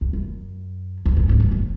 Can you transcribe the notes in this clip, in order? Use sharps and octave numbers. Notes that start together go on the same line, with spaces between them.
E2
F#2
E2
F#2
G#2
F#2
F#2